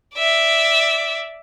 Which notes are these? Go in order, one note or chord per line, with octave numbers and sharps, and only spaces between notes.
D5 E5